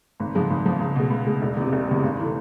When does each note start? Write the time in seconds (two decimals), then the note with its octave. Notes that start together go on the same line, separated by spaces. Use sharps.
0.20 G#1
0.35 G#2 F3 G#3
0.50 G#1
0.65 G#2 F3 G#3
0.80 C#2
0.96 B2 G#3
1.10 C#2
1.27 B2 G#3
1.42 E1
1.57 E2 C3
1.73 E1
1.88 E2 C3
2.03 G#1
2.20 E3 A3